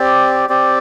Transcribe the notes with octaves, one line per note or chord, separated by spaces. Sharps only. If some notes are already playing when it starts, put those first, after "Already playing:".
Already playing: C4 G4 D5
C4 G4 D5